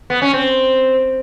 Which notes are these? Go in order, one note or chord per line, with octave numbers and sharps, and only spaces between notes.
B3
C#4
C4